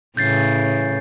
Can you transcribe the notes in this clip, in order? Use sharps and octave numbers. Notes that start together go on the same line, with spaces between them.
A2 C#3 E3 G6 A6 C7